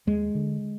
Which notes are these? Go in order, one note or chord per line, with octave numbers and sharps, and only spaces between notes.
D#2 G#3
D3